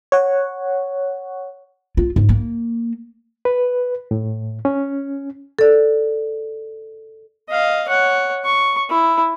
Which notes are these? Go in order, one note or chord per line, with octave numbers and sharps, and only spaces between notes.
C#5 F#5
F4
G#2
A#3
B4
A2
C#4
A4 D5
D#5 F5
C#5 F#5
C#6
E4